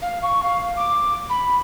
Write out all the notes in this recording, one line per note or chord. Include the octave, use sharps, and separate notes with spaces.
F5
C#6
F5
D6
B5